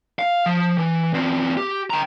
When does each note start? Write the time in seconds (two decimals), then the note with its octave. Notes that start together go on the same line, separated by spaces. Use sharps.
0.19 F5
0.46 F3
0.78 E3
1.14 E2 C4
1.57 G4
1.90 G5 A#5